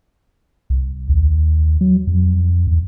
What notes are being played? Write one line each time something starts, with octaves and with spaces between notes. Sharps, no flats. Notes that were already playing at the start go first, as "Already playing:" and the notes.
C2
D#2
F#3
F2
E2